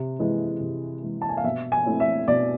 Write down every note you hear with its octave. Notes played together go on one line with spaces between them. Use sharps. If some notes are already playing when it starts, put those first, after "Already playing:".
Already playing: C3
E3 G#3
C3
E3 G#3
A5
G#5
F5
B2 E5
G#5
A3 C4 E4
E5
B2 D5